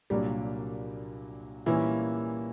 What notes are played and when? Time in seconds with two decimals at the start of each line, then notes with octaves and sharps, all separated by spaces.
0.10 C2 A#2 F#3 G3 A#3 D4
1.66 A#2 E3 G3 A#3 C#4 E4